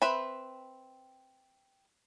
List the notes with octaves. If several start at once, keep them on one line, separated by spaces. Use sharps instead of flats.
C4 B4 E5 B5